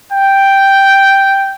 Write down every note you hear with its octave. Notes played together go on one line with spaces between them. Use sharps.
G5